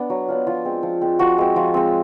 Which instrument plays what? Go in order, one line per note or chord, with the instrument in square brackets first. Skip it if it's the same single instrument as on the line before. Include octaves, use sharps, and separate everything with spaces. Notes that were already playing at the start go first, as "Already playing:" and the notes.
Already playing: [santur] B3 D4
F#3
B3 D4 F4
F3 F4
G#3 C4
F3
G#3 C4
F3 F#4
G#3 C4
F3
G#3 C4